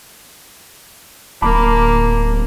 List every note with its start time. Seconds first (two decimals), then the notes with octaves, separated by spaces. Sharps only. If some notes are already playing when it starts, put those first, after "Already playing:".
1.42 D1 A#3 A5 B5 D6